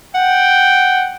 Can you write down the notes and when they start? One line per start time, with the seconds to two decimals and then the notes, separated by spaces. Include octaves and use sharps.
0.15 F#5 G5